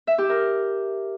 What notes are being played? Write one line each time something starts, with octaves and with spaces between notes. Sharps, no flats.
E5
G4
A#4